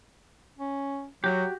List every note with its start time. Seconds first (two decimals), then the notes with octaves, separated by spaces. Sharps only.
0.58 C#4
1.24 F#3 F#4 G4